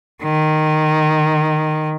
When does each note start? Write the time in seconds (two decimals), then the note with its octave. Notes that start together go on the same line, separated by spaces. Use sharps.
0.23 D#3